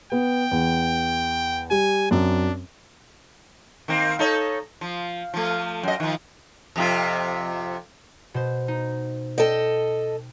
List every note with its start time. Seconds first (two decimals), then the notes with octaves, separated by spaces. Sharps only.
0.12 B3 G5
0.51 E2
1.71 G3 G4 G#5
2.11 F#2 C4 D4
3.88 D#3 A#3 C4
4.19 D#4 A4 C#5
4.81 F3
5.34 F3 A3
5.83 F#2 D#5
6.00 D#3 F3
6.76 F2 C3 F4
8.34 B2 C5
8.68 D#4
9.38 A4 D#5 G5